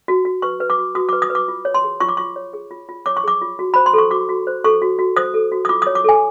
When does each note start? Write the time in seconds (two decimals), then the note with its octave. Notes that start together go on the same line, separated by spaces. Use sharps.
0.08 F#4
0.25 F#4
0.42 B4 C#6
0.60 B4
0.70 D6
0.78 F#4
0.95 F#4 D#6
1.09 D6
1.13 B4
1.22 D#6
1.30 B4
1.35 D6
1.48 F4
1.65 C#5
1.74 C6
1.84 G#4
2.00 F4 C#6
2.09 D6
2.17 F4 C#6
2.36 C#5
2.53 G#4
2.71 F4
2.89 F4
3.06 C#5 D6
3.17 C#6
3.24 G#4 D6
3.41 F4
3.59 F#4
3.74 C5 B5
3.86 C6
3.93 A4 C#6
4.11 F#4 D6
4.29 F#4
4.47 C5
4.64 A4 C#6
4.82 F#4
4.99 F#4
5.17 C5 D#6
5.34 A4
5.52 F#4
5.65 D#6
5.69 F4 D6
5.82 D#6
5.87 C#5
5.95 D6
6.04 A4 G#5